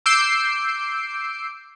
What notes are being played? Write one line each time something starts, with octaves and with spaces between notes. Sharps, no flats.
D6 E6 G6 C7 D7